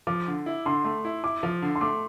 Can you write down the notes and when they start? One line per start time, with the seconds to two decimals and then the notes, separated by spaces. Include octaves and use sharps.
0.07 F3 D6
0.27 D3
0.46 E4
0.66 D3 C6
0.85 A3
1.05 E4
1.24 E4 D6
1.43 F3
1.62 D3
1.75 C6
1.81 A3 D6